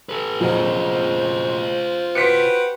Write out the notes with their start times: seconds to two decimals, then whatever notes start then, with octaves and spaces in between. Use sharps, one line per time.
0.09 G4 A4 B4
0.40 F2 A#2 F#3 F4 G#4 C5
2.15 F#4 G4 B4 C6 B6 C#7